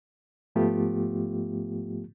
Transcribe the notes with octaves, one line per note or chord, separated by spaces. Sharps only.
G#2 F3 A3 B3 F4 G4